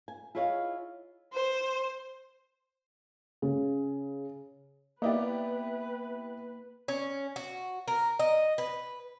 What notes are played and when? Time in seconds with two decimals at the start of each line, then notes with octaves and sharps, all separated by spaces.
0.08 G#5
0.35 E4 F4 G#4 C#5 D#5 F5
1.33 C5
3.42 C#3
5.02 A#3 B3 E4 G4 B4 D5 D#5
6.88 C#4
7.36 F#4
7.88 A#4
8.19 D#5
8.58 B4